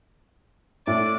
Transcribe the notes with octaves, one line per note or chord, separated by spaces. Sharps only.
A2 D5